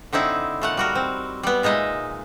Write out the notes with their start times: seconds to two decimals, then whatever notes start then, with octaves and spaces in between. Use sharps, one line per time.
0.13 D3 C4 D#4 E4
0.62 A#2 A3 F#5
0.77 G3 F#4 A#4
0.95 C4
1.43 G3 B3
1.63 A#2 G#3 D#4 D#5 E5